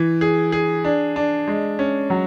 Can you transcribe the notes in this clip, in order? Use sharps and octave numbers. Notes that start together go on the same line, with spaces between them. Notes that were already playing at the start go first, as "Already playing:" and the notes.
Already playing: E3
G#4
G#4
D4
D4
G#3
C#4
F#3